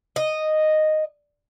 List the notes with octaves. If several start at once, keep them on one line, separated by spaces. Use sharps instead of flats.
D#5